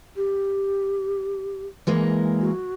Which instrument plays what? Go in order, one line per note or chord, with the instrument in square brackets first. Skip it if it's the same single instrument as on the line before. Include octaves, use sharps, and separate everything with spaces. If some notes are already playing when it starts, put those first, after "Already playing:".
[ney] G4
[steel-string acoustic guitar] E3 G#3 A#3
[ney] F#4